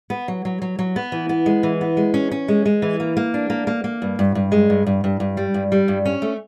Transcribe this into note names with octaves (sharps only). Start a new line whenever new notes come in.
B3
F#3
F#3
F#3
F#3
B3
E3
B3
G#3
E3
B3
G#3
C#4
C#4
G#3
G#3
E3
A#3
A#3
D4
A#3
A#3
A#3
G2
G2
G2
G#3
G2
G2
G2
G2
G3
G2
G3
G2
C#4
A3